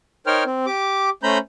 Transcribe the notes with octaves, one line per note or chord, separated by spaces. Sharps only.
D#4 A#4 C5 C#5 G5 F6
C4
G4 D6
A3 C#4 C5 A#5 B5 G6